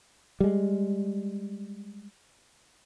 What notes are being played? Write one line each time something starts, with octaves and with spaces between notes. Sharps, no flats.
G3 G#3